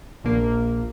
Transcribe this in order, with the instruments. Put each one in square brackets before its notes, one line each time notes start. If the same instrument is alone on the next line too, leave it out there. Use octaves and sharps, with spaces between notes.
[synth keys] A#1 A#3